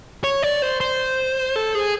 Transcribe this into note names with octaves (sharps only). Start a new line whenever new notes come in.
C#5
D5
C5
C5
A4
G#4